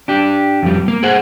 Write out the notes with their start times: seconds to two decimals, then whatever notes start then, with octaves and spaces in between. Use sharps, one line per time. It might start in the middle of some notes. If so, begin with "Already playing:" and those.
0.08 D4 G4
0.63 F2 G3
0.88 A#3
1.03 G#4 C5 F#5